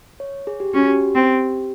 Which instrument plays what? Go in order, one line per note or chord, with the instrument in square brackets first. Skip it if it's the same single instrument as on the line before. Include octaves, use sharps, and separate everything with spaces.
[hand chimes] C#5
G#4
G4
[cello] C#4 [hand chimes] F#4
[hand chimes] G4
[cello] C4